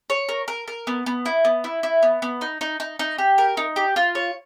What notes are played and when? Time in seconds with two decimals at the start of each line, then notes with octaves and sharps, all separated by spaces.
0.10 C#5
0.29 A#4
0.48 A#4
0.68 A#4
0.87 B3
1.06 B3
1.26 E4
1.45 B3
1.64 E4
1.83 E4
2.03 B3
2.22 B3
2.41 D#4
2.61 D#4
2.80 D#4
2.99 D#4
3.18 G4
3.38 A#4
3.57 D#4
3.76 G4
3.96 F4
4.15 C#5